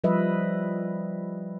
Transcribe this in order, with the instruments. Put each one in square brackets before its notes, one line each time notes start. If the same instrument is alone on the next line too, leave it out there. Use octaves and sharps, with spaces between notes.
[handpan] F3 G3 B4 D#5 E5